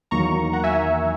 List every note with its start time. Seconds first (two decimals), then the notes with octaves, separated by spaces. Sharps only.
0.11 E2 D#3 F#3 A#3 A#5 C#6
0.53 F#5 A#5
0.64 E5 G#5